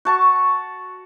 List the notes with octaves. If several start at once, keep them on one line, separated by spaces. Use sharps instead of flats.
F#4 A5 C#6